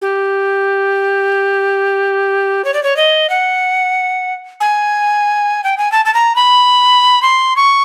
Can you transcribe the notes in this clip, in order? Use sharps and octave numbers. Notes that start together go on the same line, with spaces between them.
G4
C#5
D5
C#5
D#5
F#5
G#5
G5
G#5
A5
A5
A#5
B5
C6
C#6